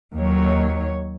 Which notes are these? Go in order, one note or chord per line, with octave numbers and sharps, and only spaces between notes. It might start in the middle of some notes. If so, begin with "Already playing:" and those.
D#2 F#3 C#5